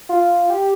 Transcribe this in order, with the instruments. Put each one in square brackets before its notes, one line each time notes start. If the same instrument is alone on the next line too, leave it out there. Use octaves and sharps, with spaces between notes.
[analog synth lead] F4
G4